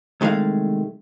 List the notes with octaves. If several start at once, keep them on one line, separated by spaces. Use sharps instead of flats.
C2 D#3 G#3 A3 F5